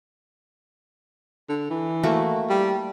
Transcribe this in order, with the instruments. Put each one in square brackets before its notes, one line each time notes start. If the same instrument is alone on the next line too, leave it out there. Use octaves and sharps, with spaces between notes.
[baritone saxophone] D3
E3
[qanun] A3 A#3 F#4
[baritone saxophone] G3